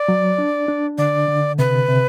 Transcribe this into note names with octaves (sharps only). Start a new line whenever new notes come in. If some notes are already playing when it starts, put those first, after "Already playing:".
Already playing: D5
F#3
D4
D4
D3 D5
D3
C3 B4
C3